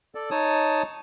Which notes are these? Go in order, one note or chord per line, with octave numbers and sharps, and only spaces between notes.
A4 D5
D#4 C#5 A5 D#6